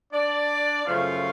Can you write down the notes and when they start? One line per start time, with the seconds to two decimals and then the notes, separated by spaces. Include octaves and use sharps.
0.13 D4 D5
0.86 F#2 C#3 F3 A3 C#4 F4 F5